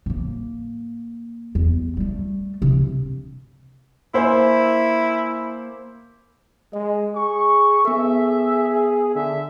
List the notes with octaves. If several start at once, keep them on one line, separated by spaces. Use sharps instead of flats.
A2 A#3
E2
G3 A3
G2 C3
A#3 E4 C5 G#5
G#3 D#5
G#4 C#6
B3 G#4 A4 E5
D3 E5